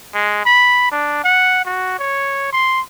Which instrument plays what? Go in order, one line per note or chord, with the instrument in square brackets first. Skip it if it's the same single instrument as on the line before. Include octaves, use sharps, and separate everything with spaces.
[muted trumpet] G#3
B5
D4
F#5
F#4
C#5
C6